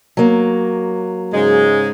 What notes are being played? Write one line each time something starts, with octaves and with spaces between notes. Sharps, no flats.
F#3 A#3
G#2 C#3 G#3